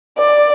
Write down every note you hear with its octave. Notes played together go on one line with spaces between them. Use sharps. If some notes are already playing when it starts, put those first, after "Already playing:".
D5